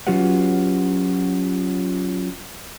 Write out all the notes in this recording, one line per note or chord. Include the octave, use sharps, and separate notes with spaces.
F#3 C#4 F4 G4 B4 F#5